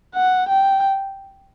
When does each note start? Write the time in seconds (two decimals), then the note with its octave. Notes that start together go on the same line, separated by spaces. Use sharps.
0.16 F#5
0.49 G5